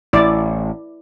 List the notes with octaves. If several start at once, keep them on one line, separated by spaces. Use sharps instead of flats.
A1 E4 D5